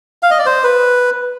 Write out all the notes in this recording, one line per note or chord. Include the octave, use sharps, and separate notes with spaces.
F5
D#5
D5
C5
B4